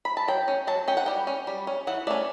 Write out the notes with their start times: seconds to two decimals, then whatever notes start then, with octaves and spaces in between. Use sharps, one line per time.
0.05 B5
0.17 A5
0.28 F#3 G5
0.48 C#4
0.67 F#3 A5
0.88 C#4 G5
0.97 F#5
1.06 G3 G5
1.27 C#4
1.47 G3
1.67 C#4
1.87 E3 F#5
2.07 A3 C#4 D5